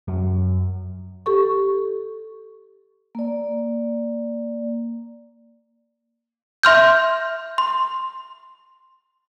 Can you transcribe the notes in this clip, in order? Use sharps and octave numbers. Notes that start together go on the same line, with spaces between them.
F#2
G4 A4 C#6
A#3 D5
E5 C6 F6 G6
C6